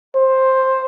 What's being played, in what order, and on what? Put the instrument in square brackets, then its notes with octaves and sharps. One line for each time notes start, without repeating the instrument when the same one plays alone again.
[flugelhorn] C5